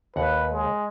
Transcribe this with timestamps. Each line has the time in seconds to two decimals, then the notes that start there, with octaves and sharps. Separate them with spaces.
0.16 D#2 B4 F#5
0.52 G#3